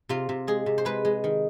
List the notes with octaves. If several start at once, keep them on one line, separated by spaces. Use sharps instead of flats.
C3 F4
C3
G#3 G#4
C3
C5
G#3 B4
G#3
D#3